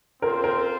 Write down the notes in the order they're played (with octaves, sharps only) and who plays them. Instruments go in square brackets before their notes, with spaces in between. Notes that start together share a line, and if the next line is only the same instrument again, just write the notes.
[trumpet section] C4 F4 C5 [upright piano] A#4
[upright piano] A#4